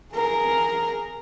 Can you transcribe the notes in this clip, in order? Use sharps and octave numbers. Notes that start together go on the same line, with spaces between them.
G#4 A#4